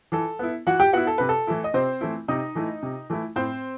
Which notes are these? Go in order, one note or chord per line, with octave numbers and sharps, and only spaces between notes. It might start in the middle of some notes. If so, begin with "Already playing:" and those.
E3 A4
B3 E4
E3 F#4 F#5
G4 G5
B3 E4 F#4 F#5
A4
C3 B4
A4
E3 A3 E4
D#5
C3 C4 C5
E3 A3 E4
C3 D#4 D#5
E3 A3 E4
C3
E3 A3 E4
A2 C4 C5